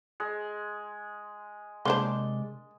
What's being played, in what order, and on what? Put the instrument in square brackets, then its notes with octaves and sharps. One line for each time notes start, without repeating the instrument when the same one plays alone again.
[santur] G#3
[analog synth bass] C3 [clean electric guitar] G#3 D5 C6 [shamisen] A#3 D4 C5